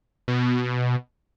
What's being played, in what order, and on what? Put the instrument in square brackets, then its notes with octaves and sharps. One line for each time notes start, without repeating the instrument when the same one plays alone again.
[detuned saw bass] B2